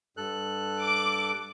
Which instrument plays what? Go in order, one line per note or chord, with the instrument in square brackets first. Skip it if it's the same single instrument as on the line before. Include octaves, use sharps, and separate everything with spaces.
[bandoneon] G2 A4 F#6
[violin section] D6